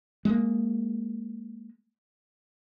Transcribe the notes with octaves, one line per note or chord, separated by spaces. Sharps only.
G#3 A#3